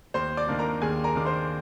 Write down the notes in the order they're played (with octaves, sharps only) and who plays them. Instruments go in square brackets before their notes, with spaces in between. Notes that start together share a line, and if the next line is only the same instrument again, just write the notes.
[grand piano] D#2 C5 C6
D5 D6
D#3 A#3 D4
A#4 A#5
D#2 G#4 G#5
A#4 A#5
D#3 A#3 D4 D6
C5 C6